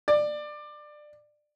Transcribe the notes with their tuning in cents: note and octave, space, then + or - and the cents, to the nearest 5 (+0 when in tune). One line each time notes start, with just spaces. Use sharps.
D5 +20